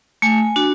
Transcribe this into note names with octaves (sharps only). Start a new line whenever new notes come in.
A3 G#5
D4 F#4